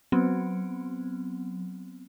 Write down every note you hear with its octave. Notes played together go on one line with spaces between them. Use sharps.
F#3 B3 C4